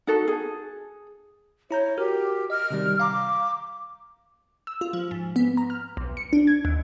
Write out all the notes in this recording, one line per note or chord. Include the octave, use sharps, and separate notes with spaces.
D#4 F#4 A4
G#4
E4 C#5 A#5 G6
F#4 G4 A#4 F6
D#5 F6
C3 D#3 G3
F5 A#5 D6
E6
F4
F3
G#2
B3
A#5
F6
B1
C#7
D4
G#6
D#2